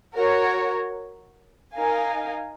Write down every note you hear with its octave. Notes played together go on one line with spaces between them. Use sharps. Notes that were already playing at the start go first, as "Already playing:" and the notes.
F#4 A#4 C#5
D#4 A#4 F5 G#5